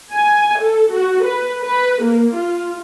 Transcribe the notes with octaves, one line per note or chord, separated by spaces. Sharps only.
G#5
A4
F#4
B4
B4
A#3
F4